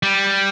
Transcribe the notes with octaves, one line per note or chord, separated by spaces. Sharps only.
G3